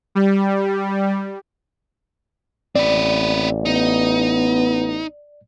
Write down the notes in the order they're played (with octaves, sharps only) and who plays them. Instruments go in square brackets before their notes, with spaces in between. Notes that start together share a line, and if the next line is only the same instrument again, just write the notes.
[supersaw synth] G3
[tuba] A1 [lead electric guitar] C4 B4 [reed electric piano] D5
[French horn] B3 [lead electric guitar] D#4